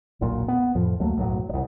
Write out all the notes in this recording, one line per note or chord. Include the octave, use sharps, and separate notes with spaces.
E1 B1 A#2 F#3
B3
F2 A2 F3
D2 F#3 A3 A#3
B1 F#2 A2 F#3
D#1 C2